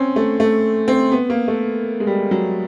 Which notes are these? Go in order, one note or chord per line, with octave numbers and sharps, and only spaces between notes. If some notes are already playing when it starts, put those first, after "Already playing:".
Already playing: C4 C#4
A3
A3
C4
B3
A#3
A3
G#3
G3
F#3